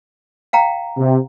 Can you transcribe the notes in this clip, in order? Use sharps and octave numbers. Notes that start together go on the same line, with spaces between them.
F5 G5 A#5
C3